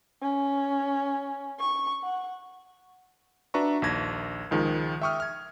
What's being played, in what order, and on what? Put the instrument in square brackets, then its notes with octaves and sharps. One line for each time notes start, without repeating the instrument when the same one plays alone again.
[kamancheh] C#4
C#6
F#5
[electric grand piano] D4 F#4 B4 E5 A#5 C#6
A#1 D#2 G#6 A#6
C#2 D#3 F3 G#3
E5 G5 C#6 D#6 F6
F6 G#6